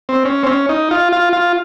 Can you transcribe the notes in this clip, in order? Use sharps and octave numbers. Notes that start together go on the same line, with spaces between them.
C4
C#4
C4
C#4
D#4
F4
F4
F4